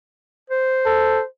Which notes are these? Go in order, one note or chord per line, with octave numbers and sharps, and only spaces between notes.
C5
A4